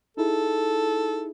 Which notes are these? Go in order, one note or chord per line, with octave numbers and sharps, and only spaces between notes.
D#4 E4 G#4 A4